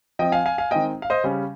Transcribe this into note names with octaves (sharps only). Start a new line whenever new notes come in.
F3 C4 D#5 G5
F5 G#5
F5 G#5
F5 G#5
D#3 G#3 C4 D#5 G5
F5
C5 D#5
C#3 G3 C#4